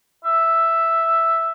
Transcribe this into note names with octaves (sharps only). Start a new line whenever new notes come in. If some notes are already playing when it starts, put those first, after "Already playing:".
E5